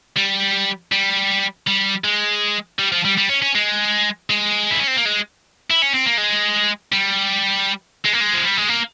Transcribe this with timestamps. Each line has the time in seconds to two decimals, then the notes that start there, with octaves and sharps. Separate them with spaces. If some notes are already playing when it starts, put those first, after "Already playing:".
0.17 G3
0.92 G3
1.67 G3
2.04 G#3
2.79 G3
2.92 F3
3.05 G3
3.18 G3
3.29 C#4
3.42 C#4
3.55 G#3
4.30 G#3
4.71 E4
4.80 C#4
4.88 C4
4.96 A#3
5.05 G#3
5.70 E4
5.82 C#4
5.94 C4
6.06 A#3
6.18 G#3
6.93 G3
8.05 G#3
8.13 A#3
8.20 G#3
8.34 F3
8.45 G3
8.57 G#3
8.69 A#3